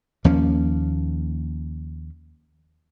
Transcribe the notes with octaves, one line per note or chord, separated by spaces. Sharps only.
D#2 F3 A#3 C#4